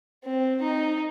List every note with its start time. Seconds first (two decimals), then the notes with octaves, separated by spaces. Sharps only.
0.25 C4
0.62 D#4